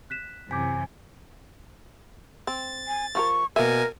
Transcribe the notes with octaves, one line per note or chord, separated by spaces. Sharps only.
F#6 B6 E7
F#2 C3 E3 G#5 D6 G6 B6
C4 A6
G#5
F3 F#4 A#4 C#6
B2 A#3 A#4 E5 G#5